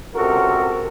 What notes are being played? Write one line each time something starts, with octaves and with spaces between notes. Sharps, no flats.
C#2 C3 F#4 A4 A#4